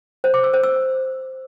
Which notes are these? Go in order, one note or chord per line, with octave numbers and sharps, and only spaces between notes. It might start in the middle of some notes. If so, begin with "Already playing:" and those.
C5
D6
E6
C5
E6